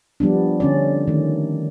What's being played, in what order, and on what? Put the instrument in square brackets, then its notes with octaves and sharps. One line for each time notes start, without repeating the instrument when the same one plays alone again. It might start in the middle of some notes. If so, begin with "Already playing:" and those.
[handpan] F3 G3 B3 D4
D3 C#4 D5
D#3 A3